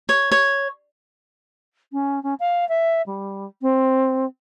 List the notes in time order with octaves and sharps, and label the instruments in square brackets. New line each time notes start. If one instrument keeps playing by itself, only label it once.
[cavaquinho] C#5
C#5
[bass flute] C#4
C#4
F5
E5
G3
C4